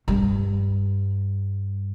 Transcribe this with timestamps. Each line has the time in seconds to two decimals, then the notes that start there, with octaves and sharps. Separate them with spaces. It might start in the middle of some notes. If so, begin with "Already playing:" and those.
0.08 G2